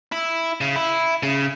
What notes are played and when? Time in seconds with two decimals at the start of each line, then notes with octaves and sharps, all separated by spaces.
0.12 E4
0.61 C#3
0.76 E4
1.23 C#3